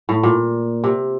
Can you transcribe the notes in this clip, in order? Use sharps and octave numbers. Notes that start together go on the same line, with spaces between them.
A2
A#2
C3